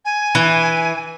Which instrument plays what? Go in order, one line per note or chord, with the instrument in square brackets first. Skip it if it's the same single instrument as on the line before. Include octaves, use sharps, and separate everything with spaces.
[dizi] G#5
[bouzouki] E3